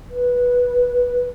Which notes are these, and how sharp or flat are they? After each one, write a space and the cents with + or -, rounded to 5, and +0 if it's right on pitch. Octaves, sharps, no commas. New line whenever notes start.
B4 -10